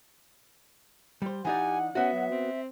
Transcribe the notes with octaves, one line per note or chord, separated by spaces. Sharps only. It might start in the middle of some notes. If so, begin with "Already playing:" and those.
G3 C5
E3 D#4 G4 D5 F#5 G#5
B3 C#4 F#4 E5
F#3
C4